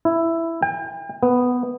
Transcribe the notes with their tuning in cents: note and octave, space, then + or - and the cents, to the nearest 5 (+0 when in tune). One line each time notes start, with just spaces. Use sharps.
E4 +5
G5 +40
B3 +5